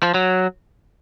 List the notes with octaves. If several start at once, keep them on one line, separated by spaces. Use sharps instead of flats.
F3
F#3